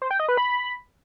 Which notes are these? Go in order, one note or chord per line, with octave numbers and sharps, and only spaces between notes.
C5
G5
D#5
B4
B5